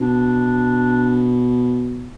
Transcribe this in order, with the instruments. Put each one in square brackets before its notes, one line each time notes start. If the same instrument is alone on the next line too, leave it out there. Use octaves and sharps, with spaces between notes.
[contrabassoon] B2 [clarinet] D4